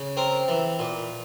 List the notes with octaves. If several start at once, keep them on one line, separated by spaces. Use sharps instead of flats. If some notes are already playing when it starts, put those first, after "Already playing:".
Already playing: C#3
C4 A#4
E3
A#2